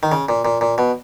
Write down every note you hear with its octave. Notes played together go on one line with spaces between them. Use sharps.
D#3
C#3
A#2
A#2
A#2
B2